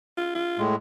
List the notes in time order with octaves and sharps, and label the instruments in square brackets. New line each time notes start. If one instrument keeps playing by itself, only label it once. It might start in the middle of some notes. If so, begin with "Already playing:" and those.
[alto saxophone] F4
F4
[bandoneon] A2 G#3